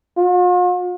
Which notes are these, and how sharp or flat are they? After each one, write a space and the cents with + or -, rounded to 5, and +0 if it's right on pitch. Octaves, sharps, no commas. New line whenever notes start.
F4 +45